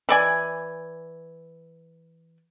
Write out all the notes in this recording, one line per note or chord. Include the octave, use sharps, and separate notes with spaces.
E3 D5 G#5